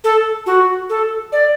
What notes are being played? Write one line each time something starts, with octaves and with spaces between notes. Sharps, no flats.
A4
F#4
A4
D5